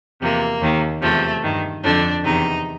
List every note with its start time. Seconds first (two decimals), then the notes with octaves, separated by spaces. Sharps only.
0.21 E2 C3 F3 A#3
0.62 D#2 D#3
1.02 E2 C3 F3 A3
1.43 G2 D#3
1.83 F2 D3 F3 D4
2.24 E2 C3 D#3 D#4